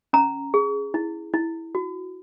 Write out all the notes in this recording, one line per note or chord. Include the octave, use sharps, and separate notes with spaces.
C#4 A#5
G#4
E4
E4
F#4